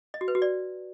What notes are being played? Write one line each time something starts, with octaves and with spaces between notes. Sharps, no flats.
D#5
F#4
B4
F#4
D5